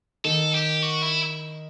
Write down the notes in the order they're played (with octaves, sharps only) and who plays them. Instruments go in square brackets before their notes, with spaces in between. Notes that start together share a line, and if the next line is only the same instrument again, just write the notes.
[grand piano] D#3 [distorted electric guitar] A4
[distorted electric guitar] G4
F#4
E4